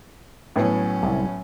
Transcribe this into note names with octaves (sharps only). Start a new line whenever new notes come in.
A2 F#3 B3 C#4 E4
C2